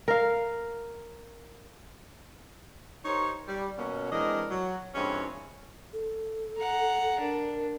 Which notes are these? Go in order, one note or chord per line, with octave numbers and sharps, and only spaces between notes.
A#4 F5
D#4 G4 A#4 C5 C#5
G3
B2 A#3 C#4
E3 G#3 C4 D4 A#4 D#5
F#3
G2 A#2 E3 G#3 C4 C#4
A4
F#5 A#5
D4 A#4